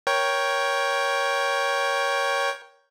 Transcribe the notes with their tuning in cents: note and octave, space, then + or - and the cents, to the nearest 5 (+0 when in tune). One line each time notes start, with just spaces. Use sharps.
A#4 +20 C#5 +0 G5 +0